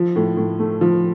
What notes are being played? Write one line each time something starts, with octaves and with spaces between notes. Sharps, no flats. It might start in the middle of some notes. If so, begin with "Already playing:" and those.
Already playing: F3
A2
A2
A3
F3